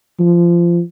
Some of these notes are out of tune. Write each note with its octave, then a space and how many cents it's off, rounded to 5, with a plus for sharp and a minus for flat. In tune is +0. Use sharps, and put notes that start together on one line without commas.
F3 -20